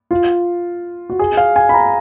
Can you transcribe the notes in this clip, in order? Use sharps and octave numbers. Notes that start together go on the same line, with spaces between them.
F4
F#4
G#4
F5
G#5
B5
A#5